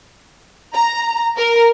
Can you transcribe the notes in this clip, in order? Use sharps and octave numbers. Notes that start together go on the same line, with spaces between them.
A#5
A#4